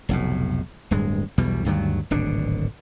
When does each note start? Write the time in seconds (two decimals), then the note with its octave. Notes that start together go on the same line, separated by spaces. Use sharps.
0.09 F1 B1 A2
0.91 D1 G2 G#3
1.38 B1 E2 B2 G3
1.65 D2 G2 D#3 F#3
2.11 D1 G#1 B2 D4